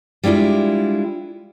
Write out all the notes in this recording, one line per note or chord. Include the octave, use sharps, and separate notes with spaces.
G3 G#3 D4 E4 F4